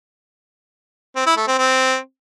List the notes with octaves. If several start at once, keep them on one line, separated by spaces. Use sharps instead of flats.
C4
E4
A3
C4
C4